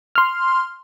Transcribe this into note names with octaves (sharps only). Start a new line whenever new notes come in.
C6 F6